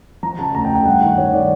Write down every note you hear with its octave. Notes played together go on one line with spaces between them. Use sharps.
F3 A#5
C#3 A5
D2 A#5
G5
D2
G5
G2 F#5
D#3 F#5
G2 C#5
D#3 D5